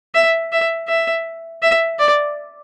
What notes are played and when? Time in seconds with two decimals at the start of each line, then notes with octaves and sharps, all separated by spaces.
0.15 E5
0.53 E5
0.88 E5
1.63 E5
1.99 D5